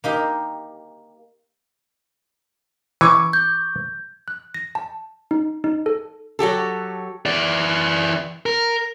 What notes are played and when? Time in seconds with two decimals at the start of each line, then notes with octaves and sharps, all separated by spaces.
0.04 A#3 D#4 G4
3.01 E3 C#6 D6 G#6
3.33 G6
4.28 F#6
4.54 A#6
4.75 A5
5.31 D#4
5.64 D#4
5.86 A4
6.39 F#3 F#4 G4 A4
7.25 E3 D5
8.46 A#4